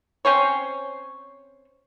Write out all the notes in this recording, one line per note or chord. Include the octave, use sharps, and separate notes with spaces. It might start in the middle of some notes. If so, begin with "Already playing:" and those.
C4 C#4 C5 C#5